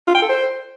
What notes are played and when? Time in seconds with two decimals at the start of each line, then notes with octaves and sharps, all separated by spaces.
0.07 F4
0.15 G5
0.22 A4
0.29 C5